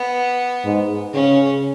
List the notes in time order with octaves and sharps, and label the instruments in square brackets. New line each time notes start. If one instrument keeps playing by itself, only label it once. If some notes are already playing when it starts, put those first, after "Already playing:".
Already playing: [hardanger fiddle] B3
[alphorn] G#2
[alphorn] C#3 [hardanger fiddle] C#4